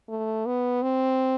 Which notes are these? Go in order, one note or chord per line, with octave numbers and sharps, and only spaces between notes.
A3
B3
C4